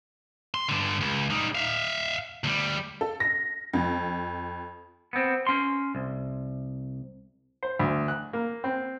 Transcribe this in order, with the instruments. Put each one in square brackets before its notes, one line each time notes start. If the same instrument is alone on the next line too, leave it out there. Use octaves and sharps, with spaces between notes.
[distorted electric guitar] C6
G2 D3
C#2
G3 D#4
E5 F5
D2 G3
[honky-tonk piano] A4
A#6
F2
[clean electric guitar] B3 C4
C#4 C6
C2
[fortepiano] C5
D2
F#6
A#3
C4